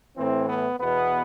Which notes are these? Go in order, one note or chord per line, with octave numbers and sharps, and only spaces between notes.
A2 E3 C4
B3
E2 B2 B3